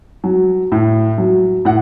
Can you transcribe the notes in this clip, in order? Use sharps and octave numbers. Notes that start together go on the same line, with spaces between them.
F#3
A2
F#3
A2 F#5